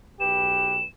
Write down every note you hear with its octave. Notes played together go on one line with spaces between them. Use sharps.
B1 G4 B4 E7